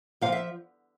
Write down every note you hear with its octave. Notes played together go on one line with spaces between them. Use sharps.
C3 F3 F5
E5